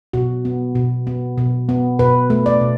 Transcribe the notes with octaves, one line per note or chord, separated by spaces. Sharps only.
B2 F#4
B3
B2
B3
B2
B3
B2 B4
A3
D5
B2